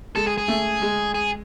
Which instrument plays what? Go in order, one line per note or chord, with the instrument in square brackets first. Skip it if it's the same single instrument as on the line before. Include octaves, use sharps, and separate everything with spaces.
[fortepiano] G#3 [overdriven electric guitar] A4
[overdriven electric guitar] G#4
G#4
[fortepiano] A3
G#3
[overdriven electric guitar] G#4